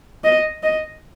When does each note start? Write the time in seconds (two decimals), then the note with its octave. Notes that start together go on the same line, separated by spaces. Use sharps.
0.24 D#5
0.63 D#5